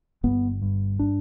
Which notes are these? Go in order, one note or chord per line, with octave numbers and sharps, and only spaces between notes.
G1 B3
G2
D4